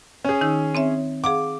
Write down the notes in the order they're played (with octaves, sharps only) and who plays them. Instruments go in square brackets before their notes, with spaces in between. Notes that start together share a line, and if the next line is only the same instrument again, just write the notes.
[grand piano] C#4 G#4
[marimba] D#3 D#4 E6
C4 C#5 E5
[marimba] G#4 F5 F#5 [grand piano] D6